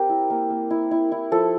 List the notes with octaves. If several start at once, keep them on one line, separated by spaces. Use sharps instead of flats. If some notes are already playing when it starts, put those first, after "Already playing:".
Already playing: C4 G4 A#4
E4
A#3
A#3
E4
E4
E4
F3 A4